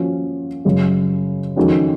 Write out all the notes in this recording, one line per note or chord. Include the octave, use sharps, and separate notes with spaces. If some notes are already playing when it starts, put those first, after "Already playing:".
Already playing: F3 A#3 C#4 F#4
F#2 C#3 G#3
F2 D#3 G#3 C#4 F#4